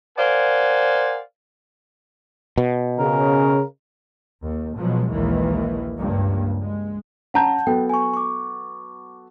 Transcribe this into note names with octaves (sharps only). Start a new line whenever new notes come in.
A#4 C5 D5 F5 F#5 G#5
B2
C#3 A#4
D#2
B2 F3 F#3 G#3
A#1 D#2 D#3 E3 G#3
C#2 G2 F3 A#3
G#3
C#4 F#5 A5 A#5 G6
F#3 B3 A4 G5
G#5 C#6
C#6 D6